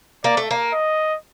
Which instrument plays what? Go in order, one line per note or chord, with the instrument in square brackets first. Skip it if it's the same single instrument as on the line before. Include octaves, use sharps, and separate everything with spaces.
[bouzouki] A#3 [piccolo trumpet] D5
[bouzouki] A3
A#3
[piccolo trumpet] D#5